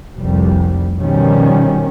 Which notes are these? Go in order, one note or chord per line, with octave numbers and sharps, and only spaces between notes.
F1 C2 G3
B2 D#3 F3 G3 C#4